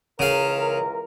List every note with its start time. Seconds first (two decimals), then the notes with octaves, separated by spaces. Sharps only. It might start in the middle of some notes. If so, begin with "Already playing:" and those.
0.19 C#2 C#3 E3 A#4 F5